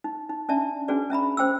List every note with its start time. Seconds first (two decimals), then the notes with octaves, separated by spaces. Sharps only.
0.04 D#4
0.30 D#4
0.49 C#4 D4 D5 E5 A5
0.88 C#4 D4 F#4 G#4 B4 D5
1.10 C#4 E5 A#5 B5
1.37 C#4 C5 G5 D6 E6